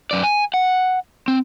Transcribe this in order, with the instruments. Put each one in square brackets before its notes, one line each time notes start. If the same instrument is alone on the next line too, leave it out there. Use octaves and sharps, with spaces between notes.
[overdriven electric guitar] F#2 D5
G#5
F#5
C4